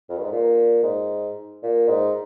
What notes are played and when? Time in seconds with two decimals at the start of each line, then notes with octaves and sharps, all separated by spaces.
0.09 F2
0.17 G2
0.23 G#2
0.32 A#2
0.83 G#2
1.63 A#2
1.88 G#2